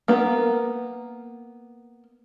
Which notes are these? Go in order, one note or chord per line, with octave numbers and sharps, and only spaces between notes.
A#3 B3 A#4